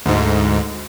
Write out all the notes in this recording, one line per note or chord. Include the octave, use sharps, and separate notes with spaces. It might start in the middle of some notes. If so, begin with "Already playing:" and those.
D2 G#2